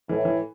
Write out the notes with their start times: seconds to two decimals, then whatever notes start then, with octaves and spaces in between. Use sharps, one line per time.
0.09 A2 E3
0.25 E3